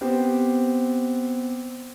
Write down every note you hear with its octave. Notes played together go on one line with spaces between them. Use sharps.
B3 C4 G4